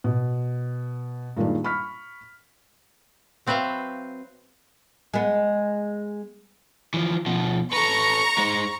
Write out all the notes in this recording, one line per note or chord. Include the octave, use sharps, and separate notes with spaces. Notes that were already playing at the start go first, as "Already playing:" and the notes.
B2
G2 A#2 D#3 G#3 D4
B5 C#6 F6 B6
F#3 C4 B4 C5 E5 F5
G#3 B3
E3 F3
B2 F3
A4 B4 A#5 C#6
G#3 C5